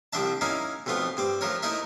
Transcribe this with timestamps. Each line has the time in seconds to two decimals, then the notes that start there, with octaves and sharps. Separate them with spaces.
0.13 C2 F3 C4 D4 E5 A5
0.41 A#3 C#4 D#4 E4 F5 G#5
0.86 B1 F2 A3 B3 F4
1.17 G2 C4 D6
1.41 F3 A3 A#4 C#5
1.63 A3 D#4 E4 A#4 E5